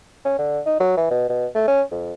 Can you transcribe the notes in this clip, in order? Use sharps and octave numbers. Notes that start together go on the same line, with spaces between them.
C#4
D3
D#4
F#3
E3
B2
B2
A3
C#4
F2